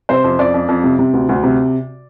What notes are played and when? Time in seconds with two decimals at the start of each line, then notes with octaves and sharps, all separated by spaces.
0.09 C3 C5
0.24 F2
0.39 F2 D5
0.54 F2
0.69 F2
0.84 C3
0.99 C3
1.13 D2
1.29 D2
1.43 C3